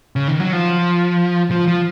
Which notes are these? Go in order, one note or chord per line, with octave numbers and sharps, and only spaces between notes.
C#3
D#3
F#3
F3
F3
F3